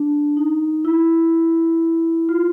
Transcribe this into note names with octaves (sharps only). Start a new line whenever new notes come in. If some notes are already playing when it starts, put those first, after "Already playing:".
Already playing: D4
D#4
E4
F4